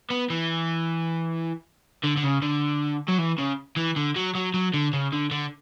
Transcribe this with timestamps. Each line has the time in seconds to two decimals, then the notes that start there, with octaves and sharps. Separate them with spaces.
0.10 B3
0.30 E3
2.03 D3
2.16 D3
2.23 C#3
2.42 D3
3.09 F#3
3.19 E3
3.39 C#3
3.77 E3
3.96 D3
4.16 F#3
4.35 F#3
4.54 F#3
4.74 D3
4.93 C#3
5.13 D3
5.31 D3